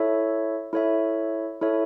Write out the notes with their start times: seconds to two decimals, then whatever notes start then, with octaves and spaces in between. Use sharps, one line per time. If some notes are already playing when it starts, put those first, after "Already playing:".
Already playing: E4 A4 C#5 E5
0.73 E4 A4 C#5 E5
1.61 E4 A4 C#5 E5